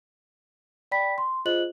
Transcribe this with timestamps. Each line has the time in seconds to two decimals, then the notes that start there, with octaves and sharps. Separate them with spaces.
0.92 D5 G5 B5 B6
1.18 C6
1.45 F4 G#4 C5 D#5 F#6 F#7